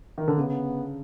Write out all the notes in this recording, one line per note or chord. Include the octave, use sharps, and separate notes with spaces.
D#3
D3
C#3 B3